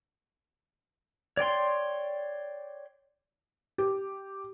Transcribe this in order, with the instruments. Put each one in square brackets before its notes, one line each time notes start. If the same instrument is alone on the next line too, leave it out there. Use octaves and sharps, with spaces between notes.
[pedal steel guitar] C#5 D5 G5 C6
[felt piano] G4